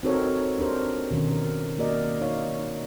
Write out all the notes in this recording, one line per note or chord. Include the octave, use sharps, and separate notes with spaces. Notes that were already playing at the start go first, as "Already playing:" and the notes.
C4 D#4 F#4 A4 A#4 C#5
D4 G4 A#4 C5
B2 D#3 C#4
A#4
A#3 F#4 A#4 D5 D#5
D#4 C#5 F5